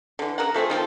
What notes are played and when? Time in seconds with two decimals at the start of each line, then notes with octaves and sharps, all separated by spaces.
0.19 D3 E3
0.38 C#3 A#4 F#5
0.54 F3 A3 C4 G#4
0.70 D#3 F3 C4 A4